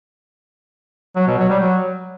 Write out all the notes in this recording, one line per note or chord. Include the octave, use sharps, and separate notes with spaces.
F#3
B2
F#3
G3
F#3